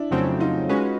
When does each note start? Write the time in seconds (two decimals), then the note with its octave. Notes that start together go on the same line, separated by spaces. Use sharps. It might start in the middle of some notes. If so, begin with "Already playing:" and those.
Already playing: D4 E4
0.11 F2 C#3 F#3 A3 C4
0.40 D#4 F4
0.69 G#3 C#4 F#4 B4